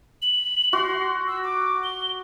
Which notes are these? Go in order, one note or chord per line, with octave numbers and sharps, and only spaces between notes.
F#7
F#4 C6
E6
D6
G7